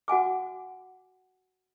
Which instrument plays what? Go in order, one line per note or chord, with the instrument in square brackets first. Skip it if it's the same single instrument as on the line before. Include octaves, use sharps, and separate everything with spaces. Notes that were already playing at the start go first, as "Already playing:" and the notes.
[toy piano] F#4 F#5 G#5 D6